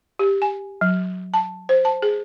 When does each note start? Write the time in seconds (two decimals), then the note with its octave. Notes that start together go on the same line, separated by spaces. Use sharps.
0.19 G4
0.42 G#5
0.81 F#3
1.34 A5
1.69 C5
1.85 A5
2.02 G#4